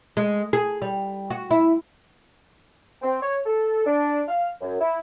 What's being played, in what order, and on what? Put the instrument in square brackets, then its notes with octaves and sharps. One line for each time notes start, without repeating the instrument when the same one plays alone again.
[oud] G#3
G#4
G3
F#4
E4
[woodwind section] C4
C#5
A4
D4
F5
F#2
E4